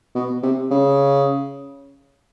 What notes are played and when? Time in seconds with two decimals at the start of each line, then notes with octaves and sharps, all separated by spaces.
0.15 B2
0.43 C3
0.71 C#3